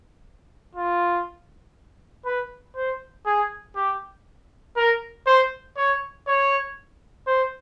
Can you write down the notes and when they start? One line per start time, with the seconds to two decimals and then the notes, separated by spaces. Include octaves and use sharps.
0.75 F4
2.25 B4
2.76 C5
3.26 G#4
3.76 G4
4.76 A#4
5.26 C5
5.76 C#5
6.27 C#5
7.27 C5